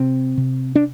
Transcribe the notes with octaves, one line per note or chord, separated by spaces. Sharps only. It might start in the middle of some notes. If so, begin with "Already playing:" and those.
Already playing: C3 C4
C3
D4